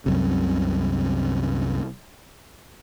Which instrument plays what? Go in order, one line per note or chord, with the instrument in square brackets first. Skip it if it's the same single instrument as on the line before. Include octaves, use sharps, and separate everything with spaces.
[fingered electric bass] C2 F#2 C3